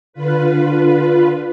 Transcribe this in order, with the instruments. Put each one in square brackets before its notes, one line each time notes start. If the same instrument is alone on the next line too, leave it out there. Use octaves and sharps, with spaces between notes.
[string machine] D3 F4 B4